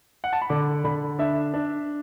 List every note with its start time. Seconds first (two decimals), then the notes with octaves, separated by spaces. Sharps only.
0.24 F#5
0.33 A5
0.42 B5
0.50 D3 D6
0.84 D3 B5
1.19 D4 E5
1.54 D4